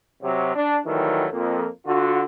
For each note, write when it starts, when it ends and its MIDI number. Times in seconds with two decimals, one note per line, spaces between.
0.23 0.53 48
0.23 0.53 54
0.55 0.78 62
0.86 1.26 51
0.86 1.26 52
0.86 1.26 54
0.86 1.26 55
0.86 1.26 57
1.32 1.67 41
1.32 1.67 58
1.86 2.23 50
1.86 2.23 65
1.86 2.23 66